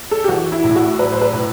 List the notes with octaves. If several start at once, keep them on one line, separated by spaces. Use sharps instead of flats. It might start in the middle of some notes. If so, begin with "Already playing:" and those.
A4
G4
E3 F#4
E4
A2
E4
F#4
F#3 B4
C5
B4
A2